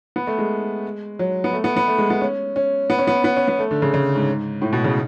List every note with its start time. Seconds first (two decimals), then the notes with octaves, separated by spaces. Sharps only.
0.16 B3
0.27 A3
0.38 G#3
1.19 F#3
1.44 B3
1.53 A3
1.64 B3
1.77 B3
1.88 A3
1.98 G#3
2.10 B3
2.21 C#4
2.56 C#4
2.90 B3
2.99 C#4
3.07 B3
3.24 B3
3.36 C#4
3.48 B3
3.59 A3
3.71 D3
3.82 C#3
3.94 C#3
4.16 G#2
4.62 A2
4.73 B2
4.84 C#3